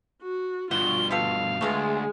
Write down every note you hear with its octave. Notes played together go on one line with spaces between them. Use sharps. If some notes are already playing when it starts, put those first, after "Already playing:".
F#4
G2 B2 F4 F#4 G7
G3 B3 A4 F5
D2 G#3 A3 B3 F4 G#4